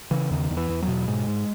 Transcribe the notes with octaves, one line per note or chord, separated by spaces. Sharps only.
C#3 E3
E2 D#3
E2
E3
E2
F#3
B2
G#2 G#3
G#2